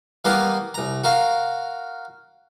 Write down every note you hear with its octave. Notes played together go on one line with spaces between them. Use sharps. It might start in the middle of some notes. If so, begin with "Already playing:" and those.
E3 G3 A#3 B3 A#4 C6
C2 A#5
F#4 A#4 F5